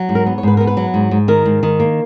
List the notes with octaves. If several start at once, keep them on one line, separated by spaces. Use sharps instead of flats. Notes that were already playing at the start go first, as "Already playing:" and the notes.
Already playing: F#3
G#2
A#4
B3
C#5
G#2 B4
B3 A#4
B4
F#3
G#2
G#2
D#3 A#4
G#2
D#3
A#3